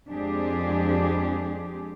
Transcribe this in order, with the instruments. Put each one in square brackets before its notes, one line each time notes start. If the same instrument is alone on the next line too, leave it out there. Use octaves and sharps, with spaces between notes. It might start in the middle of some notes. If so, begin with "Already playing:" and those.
[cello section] F2 G#3 C4 D4 G4 G#4